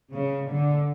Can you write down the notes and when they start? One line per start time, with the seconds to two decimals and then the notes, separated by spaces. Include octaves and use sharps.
0.13 C#3
0.50 D3